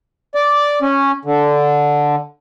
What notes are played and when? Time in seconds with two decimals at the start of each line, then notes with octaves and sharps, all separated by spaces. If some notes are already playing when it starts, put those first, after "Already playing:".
0.35 D5
0.82 C#4
1.25 D3